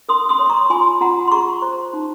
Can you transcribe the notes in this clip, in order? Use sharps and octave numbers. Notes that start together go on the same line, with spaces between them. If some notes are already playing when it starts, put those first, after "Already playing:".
A#4 C6 D#6
C6 D#6
C#5
C6
A#5 C#6
F4 G#5 C6
F4 F#5 A#5
C6
G#4 A#5 C#6
C5
D#4